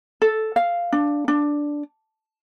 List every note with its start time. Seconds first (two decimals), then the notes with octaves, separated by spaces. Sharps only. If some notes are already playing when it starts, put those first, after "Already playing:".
0.22 A4
0.56 F5
0.92 D4
1.28 D4